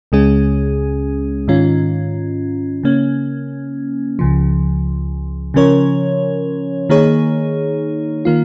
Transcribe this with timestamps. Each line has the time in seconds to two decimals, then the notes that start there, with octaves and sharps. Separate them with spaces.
0.12 C#2 C#3 G#3 C#4 G#4
1.48 G#2 D#3 C#4 F4
2.83 C#3 A#3 C#4
4.19 C#2 C#3 F3
5.54 C#3 F3 C#4 A#4 C#5
6.89 D#3 A#3 D#4 G#4 C#5
8.25 D#3 A#3 F4